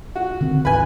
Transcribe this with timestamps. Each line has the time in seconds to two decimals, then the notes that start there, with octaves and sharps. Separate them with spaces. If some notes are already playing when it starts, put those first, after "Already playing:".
0.16 F#4
0.41 D3 D#3 C4
0.65 C#2 G#2 D3 B4 G#5